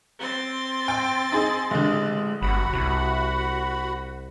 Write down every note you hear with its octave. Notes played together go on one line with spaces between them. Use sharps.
C4 C6 A6
G5
D#4 G#4
A1 D3 G#3
G1 F#4 F#5 B5
C2